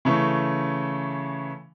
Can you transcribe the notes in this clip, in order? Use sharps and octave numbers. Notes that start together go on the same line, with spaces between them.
C#3 E3 A3 C#4